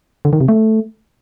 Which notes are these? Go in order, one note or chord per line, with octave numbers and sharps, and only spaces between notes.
D3
D#3
C3
A3